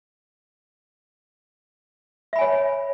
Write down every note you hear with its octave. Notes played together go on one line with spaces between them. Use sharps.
C#5 E5 G#5 B5